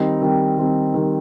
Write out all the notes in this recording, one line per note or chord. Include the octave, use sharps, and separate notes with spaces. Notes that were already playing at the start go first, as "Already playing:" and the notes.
Already playing: D#3 G3 C4 D#4
D#3 G3 C4 D#4
D#3 G3 C4 D#4
D#3 G3 C4 D#4